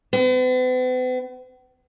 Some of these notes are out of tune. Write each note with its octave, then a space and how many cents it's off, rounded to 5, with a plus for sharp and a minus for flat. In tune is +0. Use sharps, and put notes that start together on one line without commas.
B3 +45